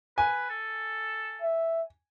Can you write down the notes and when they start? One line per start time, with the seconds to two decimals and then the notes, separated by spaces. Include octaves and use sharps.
0.18 B4 G#5
0.50 A4
1.42 E5